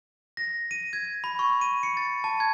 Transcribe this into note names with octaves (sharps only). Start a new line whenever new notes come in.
A#6
D#7
G#6
B5
C#6
D#7
C#7
A6
A5
G#6